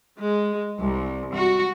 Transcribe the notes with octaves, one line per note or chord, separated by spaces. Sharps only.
G#3
C2
F#4